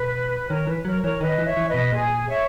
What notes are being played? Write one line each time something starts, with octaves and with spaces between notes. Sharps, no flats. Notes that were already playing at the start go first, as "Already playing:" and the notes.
Already playing: B2 B4
D#3 A#4 C#5
E3 B4
F#3 A#4 C#5
E3 A#4 C#5
D#3 B4 D#5
E3
C#5 E5
E3
B4 D#5
B2
A#2 G#4
C#5 E5